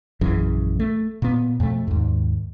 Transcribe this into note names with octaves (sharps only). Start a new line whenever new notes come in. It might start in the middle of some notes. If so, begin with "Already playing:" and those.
A#1 F#2 C#3 E3
A3
A#2 B3
F2 B2 A3
D#2 G#2